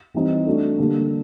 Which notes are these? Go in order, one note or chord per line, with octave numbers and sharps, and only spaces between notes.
E3 G3 C4 D#4
A3 D4 F#4
D3 G3 A#3